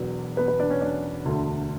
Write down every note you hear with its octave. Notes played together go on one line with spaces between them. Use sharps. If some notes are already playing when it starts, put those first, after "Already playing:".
Already playing: E1 E2 B2 F#3 B3
B3 B4
B3 B4
D4 D5
C#4 C#5
D4 D5
E1 D2 D3 A3